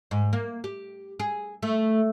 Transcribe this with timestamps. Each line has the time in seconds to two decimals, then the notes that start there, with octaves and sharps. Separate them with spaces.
0.11 G#2
0.33 A#3
0.64 G4
1.19 G#4
1.63 A3